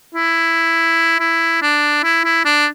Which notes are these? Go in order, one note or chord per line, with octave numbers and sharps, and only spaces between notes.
E4
E4
D4
E4
E4
D4